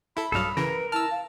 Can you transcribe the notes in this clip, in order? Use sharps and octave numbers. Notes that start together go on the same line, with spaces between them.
E4 A4 B5
B1 G2 F#3 A4 F5 D#6
C#3 E3 A#4 B4
E4 A5 E6 F6
F5